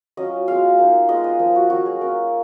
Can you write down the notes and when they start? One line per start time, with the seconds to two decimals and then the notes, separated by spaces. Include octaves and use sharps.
0.17 F#3 C#4 F4 D#5
0.47 G#3 B3 F4 F5
0.79 A#3 D#4
1.09 G#3 B3 F4 D#5
1.24 D#5
1.39 F3 A#3 D#4
1.56 F#4
1.70 F#3 A#3 C#4 F#4
1.86 G#4
2.01 A#3 C#4 F4 A#4